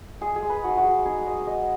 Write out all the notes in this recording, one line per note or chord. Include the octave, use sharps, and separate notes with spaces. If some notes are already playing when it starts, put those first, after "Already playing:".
G#3 G#4
G#4
G#3
B4
D#4 F#4
F#4
G#3
D#4 G#4
G#3 D#5
G#3 D#5